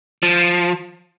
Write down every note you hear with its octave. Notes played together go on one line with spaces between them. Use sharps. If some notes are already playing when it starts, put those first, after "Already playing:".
F3